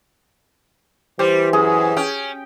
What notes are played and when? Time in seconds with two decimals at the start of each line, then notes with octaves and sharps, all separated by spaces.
1.19 E3 G3 G4 C5
1.53 F#2 G#4
1.97 C#4 G5